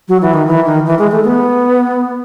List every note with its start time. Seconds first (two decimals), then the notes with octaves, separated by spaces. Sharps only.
0.08 F#3
0.22 E3
0.34 D#3
0.47 E3
0.66 D#3
0.86 E3
0.99 G#3
1.11 A3
1.24 B3